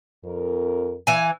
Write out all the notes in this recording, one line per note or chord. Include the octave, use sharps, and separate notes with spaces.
F2 A#4
E3 G#5